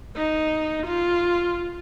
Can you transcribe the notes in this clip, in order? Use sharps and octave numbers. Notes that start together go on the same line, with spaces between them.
D#4
F4